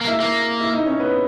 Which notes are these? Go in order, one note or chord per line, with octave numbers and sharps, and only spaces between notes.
A#3
E4 E5
A#3
E4 E5
D#4 D#5
C#4 C#5
B3 B4